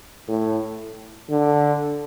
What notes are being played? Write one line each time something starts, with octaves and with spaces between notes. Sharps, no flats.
A2
D3